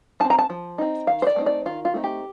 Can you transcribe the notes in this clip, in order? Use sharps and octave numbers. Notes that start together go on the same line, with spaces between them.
C4 D#4 A5
A#5
A5
F3
C4 D#4
D#3 F5
C5
D5
A3 C4 D#4
D5
D#3 F4
F4
A3 C4 D#4
G4